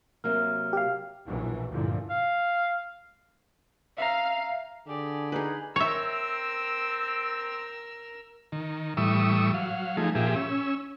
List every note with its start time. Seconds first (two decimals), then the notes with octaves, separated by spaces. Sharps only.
0.24 C3 F#3 A#3 F6
0.73 G4 F5
1.26 A#1 B2 E3 F#3
1.69 D2 G2 A#2 D3 E3 F3
2.10 F5
3.98 E5 F5 A#5
4.87 D3 G4 G#4 D5
5.32 D#4 G#4 B4
5.76 C4 A#4 C#5 E5 E6
8.52 D#3
8.97 A2 E3 G3 C#6 D#6 E6
9.54 F#3 F5
9.97 F3 A3 D#4 G#4
10.15 A#2 F3 G4 G#4 E5
10.36 C#4 E6